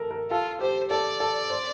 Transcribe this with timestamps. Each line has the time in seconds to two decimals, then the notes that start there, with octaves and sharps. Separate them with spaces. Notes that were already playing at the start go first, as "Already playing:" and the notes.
Already playing: A4 A#4
0.11 A#4
0.30 F4 A4
0.61 G4 C5
0.90 A4 D5
1.20 A4
1.50 C5